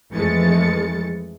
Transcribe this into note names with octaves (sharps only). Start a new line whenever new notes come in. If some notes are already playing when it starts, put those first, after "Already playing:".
F2 E3 G#3 A3 A6 C#7